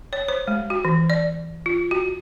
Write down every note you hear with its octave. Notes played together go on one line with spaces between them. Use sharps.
C#5
C5
G#3
F#4
E3
D5
F4
F#4